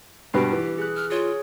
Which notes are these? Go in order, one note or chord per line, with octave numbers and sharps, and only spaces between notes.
G2 B2 B3 G4 C7 D7
E3
G#4 F#6
F6
F4 G#4 C#5